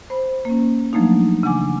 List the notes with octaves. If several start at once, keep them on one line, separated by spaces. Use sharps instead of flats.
C5 B5
A#3 C#4
F3 F#3 A3 A#3 D4 D#4
C#3 E3 D4 F#5 G#5 D6